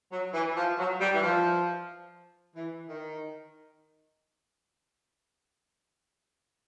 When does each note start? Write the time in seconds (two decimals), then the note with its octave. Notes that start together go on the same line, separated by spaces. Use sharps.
0.12 F#3
0.34 E3
0.56 F3
0.79 F#3
1.00 G3
1.14 E3
1.23 F3
2.56 E3
2.89 D#3